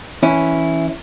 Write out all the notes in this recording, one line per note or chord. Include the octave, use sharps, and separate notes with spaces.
E3 C#4 E4